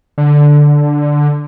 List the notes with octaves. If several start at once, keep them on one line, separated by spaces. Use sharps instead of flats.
D3